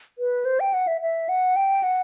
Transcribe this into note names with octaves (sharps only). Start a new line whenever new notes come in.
B4
C5
G5
F#5
E5
E5
F#5
G5
F#5